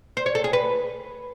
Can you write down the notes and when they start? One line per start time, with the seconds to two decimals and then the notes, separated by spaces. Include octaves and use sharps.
0.17 C5
0.26 C#5
0.35 A4
0.44 G#4
0.53 B4